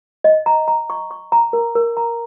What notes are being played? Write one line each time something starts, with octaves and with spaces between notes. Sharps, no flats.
D#5
A#5
A#5
C#6
C#6
A#5
A#4
A#4
A#5